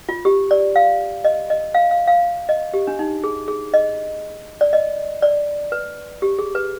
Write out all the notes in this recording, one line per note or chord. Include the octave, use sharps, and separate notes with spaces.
F4
G4
D5
F5
D#5
D#5
F5
F5
F5
D#5
G4
D4
D#4
G#4
G#4
D#5
D5
D#5
D5
B4
G4
G#4
B4